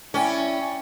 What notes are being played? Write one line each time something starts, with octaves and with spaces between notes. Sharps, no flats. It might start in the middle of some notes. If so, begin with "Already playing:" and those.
C#4 E4 D5 G5